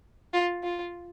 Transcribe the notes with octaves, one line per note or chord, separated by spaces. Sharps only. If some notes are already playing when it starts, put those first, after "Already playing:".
F4
F4